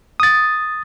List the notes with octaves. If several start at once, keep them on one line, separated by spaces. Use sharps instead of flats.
D#6 A6